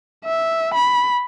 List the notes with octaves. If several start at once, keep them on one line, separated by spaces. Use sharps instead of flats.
E5
B5